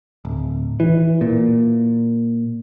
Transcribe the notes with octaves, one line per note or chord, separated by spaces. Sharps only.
D1
E3
A#2